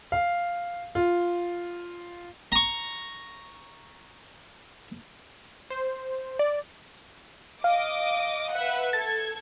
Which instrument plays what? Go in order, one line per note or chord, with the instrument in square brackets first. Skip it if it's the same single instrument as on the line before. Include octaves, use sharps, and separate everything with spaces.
[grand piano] F5
F4
[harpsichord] A#5 C#6
[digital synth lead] C5
D5
[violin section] D#5 D6 D#6 [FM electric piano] F5
[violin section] B4 E5 F#5
[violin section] A4 G#6 [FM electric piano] A6